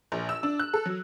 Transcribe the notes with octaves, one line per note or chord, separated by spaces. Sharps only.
A#1
E6
D4
F#6
A4
F#3